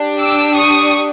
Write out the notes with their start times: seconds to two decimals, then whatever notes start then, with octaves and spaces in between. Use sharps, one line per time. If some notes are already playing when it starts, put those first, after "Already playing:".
Already playing: D4 G4
0.21 D6 E6
0.56 C#6 D#6